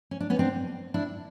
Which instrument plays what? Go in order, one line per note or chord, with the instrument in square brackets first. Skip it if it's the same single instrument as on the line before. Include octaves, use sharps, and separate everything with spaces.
[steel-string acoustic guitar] C#4
D4
B3 C#4
C4 D4
D4 E4